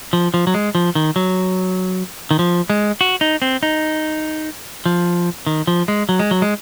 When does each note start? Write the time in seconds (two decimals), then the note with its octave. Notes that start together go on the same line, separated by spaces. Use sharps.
0.13 F3
0.34 F3
0.47 F#3
0.54 G#3
0.75 F3
0.95 D#3
1.16 F#3
2.31 D#3
2.39 F3
2.70 G#3
3.01 F#4
3.21 D#4
3.42 C4
3.63 D#4
4.86 F3
5.46 D#3
5.67 F3
5.88 G#3
6.09 F#3
6.20 G#3
6.31 F#3
6.42 G#3